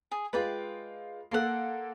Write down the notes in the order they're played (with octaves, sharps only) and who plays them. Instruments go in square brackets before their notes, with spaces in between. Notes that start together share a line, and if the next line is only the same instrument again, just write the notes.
[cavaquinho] G#4
[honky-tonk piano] G#3 F4 [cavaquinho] B4 D5 G5
[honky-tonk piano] A#3 A4 [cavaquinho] F#5 C6